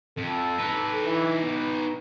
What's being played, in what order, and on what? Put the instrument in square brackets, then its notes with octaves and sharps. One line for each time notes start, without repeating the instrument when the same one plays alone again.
[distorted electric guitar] F2 [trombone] A4
[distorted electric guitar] D#4 B4
[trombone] E3
B3